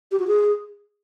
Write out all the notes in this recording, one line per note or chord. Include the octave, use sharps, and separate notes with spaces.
G4
F#4
G#4